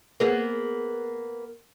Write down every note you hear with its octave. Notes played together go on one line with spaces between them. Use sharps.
A#3 B3 G#4